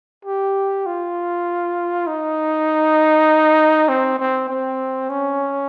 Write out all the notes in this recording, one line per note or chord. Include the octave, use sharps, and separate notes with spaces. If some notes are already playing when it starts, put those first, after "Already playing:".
G4
F4
D#4
C4
C4
C4
C#4